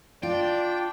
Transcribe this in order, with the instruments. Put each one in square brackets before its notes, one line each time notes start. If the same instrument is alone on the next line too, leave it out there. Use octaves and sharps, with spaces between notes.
[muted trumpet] D4 [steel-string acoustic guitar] F4 [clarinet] D5 [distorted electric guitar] G5